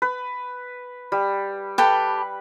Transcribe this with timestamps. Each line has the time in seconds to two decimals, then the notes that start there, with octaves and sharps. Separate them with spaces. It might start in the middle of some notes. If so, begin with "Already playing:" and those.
0.02 B4
1.12 G3
1.78 G4 A4 B4 G5